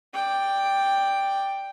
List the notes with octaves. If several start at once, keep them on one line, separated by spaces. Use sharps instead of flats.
D5 G5